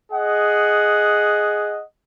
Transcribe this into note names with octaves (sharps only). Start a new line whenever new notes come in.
G#4 D#5 F#5